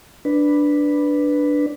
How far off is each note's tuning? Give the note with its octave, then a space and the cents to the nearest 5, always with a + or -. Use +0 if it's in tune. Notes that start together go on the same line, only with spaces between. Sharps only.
D4 +0 B4 +0